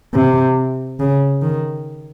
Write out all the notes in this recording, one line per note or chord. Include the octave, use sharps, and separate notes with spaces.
C3
C#3
D#3